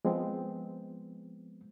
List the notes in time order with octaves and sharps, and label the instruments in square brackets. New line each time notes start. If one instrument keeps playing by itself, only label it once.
[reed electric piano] F3 G#3 B3 C4